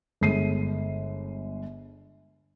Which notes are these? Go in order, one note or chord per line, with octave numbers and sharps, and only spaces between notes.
G1 G#3 C7 D#7